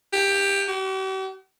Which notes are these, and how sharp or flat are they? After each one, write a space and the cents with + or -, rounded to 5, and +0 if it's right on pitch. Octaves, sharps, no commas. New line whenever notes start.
G4 +15
G4 -45